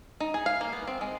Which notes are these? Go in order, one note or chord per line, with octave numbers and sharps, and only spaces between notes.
D#4
G#4
F5
A#3
B3
C4
G#3